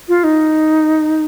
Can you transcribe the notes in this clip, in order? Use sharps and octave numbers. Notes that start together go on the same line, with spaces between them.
F4
D#4